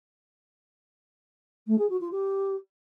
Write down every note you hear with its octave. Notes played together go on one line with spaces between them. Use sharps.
A3
G#4
F#4
F4
G4